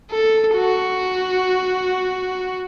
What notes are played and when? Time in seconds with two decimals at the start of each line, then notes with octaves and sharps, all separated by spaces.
0.12 A4
0.56 F#4